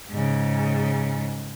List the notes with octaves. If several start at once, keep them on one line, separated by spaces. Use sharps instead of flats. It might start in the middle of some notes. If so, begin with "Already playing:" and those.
G#2 C#3